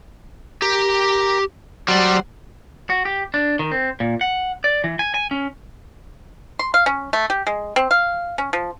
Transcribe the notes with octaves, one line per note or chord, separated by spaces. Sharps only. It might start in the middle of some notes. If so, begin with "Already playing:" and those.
G4 A#4
F#3 G3 C5 D5
F#4
G4
D4
D#3
C4
A#2
F#5
D5
E3
G#5
G#5
C#4
C6
F5
C#4
A3
G4
G#3
C4
F5
C#4
F3